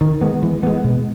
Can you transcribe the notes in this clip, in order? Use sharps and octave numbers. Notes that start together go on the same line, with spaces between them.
D#3
G#3 B3
E3
G#3 B3
B2